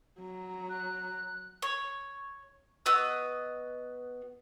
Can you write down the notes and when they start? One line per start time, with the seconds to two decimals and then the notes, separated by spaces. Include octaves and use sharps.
0.20 F#3 A#5
0.70 F#6
1.62 C#5
2.86 B3 F#4 D#5 E6